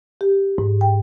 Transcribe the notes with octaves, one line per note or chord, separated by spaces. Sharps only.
G4
G#2
G5